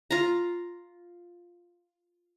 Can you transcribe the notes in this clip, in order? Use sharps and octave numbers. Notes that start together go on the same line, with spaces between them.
F4 A#5